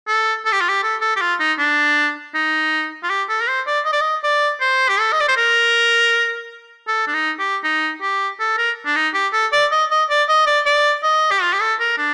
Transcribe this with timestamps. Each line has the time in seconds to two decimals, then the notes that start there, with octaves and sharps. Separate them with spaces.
0.08 A4
0.45 A4
0.52 G4
0.61 F4
0.69 G4
0.83 A4
1.01 A4
1.16 G4
1.21 F4
1.40 D#4
1.58 D4
2.35 D#4
3.03 F4
3.10 G4
3.29 A4
3.42 A#4
3.48 C5
3.67 D5
3.85 D#5
3.93 D5
4.01 D#5
4.24 D5
4.61 C5
4.89 G4
4.99 A4
5.13 D#5
5.20 D5
5.28 C5
5.37 A#4
6.88 A4
7.07 D4
7.14 D#4
7.39 G4
7.64 D#4
8.02 G4
8.40 A4
8.58 A#4
8.86 D4
8.96 D#4
9.14 G4
9.33 A4
9.52 D5
9.72 D#5
9.91 D#5
10.10 D5
10.28 D#5
10.47 D5
10.66 D5
11.03 D#5
11.31 G4
11.42 F4
11.53 G4
11.61 A4
11.80 A#4
11.98 D4